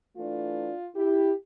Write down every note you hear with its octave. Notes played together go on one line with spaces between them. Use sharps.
E3 A3 D4 F4
E4 G4